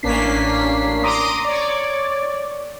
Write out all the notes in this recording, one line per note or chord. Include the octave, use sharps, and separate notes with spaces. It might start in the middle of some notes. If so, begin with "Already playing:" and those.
A1 A#3 C#4 D4 B6 C7
A#5 C6 D6 D#6
C#5 D5